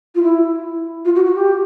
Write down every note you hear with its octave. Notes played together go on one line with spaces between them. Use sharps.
F4
E4
F4
F#4
F#4
G4